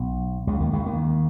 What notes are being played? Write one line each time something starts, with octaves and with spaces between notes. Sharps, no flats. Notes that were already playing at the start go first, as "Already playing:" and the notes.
Already playing: B1 B2
C#2 C#3
D#2 D#3
C#2 C#3
D#2 D#3